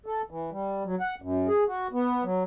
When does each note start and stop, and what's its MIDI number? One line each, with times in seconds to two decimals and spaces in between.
0.06 0.22 69
0.30 0.50 52
0.51 0.83 55
0.85 0.95 54
1.00 1.15 78
1.22 1.48 42
1.48 1.64 68
1.68 1.87 66
1.93 2.24 59
2.24 2.43 54